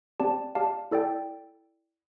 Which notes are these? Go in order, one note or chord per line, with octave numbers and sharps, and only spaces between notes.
C4 G4 D5 A5
G4 D5 F5 A5
E4 A4 D5 G5